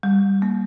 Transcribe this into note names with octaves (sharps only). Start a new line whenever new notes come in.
G3
A#3